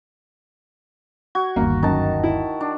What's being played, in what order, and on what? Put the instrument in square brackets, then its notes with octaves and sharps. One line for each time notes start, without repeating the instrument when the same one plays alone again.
[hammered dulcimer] F#4 [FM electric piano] G#6
[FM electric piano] G1 D#2 [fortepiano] A#3
[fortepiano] F#2 [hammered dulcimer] D#3 A5
[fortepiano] E4
[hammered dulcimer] D4